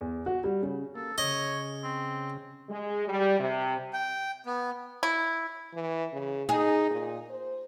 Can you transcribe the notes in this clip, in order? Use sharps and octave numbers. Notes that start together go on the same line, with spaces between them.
E2
F#4
G3
C#3
A#3 A4
C#3 C#5 D#5
C4
G#3
G3
C3
G5
B3
E4
E3
C#3
D#4 G#4
A#2
C5